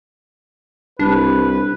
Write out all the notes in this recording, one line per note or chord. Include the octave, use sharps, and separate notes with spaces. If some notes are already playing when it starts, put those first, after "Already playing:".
C2 D4 B4